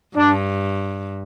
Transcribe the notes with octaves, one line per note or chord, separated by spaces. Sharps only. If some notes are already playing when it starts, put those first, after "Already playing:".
G2 D4